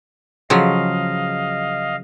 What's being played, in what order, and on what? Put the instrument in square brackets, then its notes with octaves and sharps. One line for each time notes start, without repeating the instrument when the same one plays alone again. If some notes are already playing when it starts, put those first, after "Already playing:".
[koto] C#3 F3 F#3 [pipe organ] D#5 F5